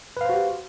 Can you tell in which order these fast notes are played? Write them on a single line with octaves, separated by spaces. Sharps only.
B4 F5 C5 F#4 G4